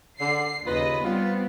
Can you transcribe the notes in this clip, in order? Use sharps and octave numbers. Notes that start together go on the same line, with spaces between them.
D3 C7
D#2 C#3 F4 B4 D#5
G3 B3 C4 F4